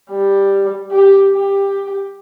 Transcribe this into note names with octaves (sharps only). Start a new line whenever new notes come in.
G3
G4
G4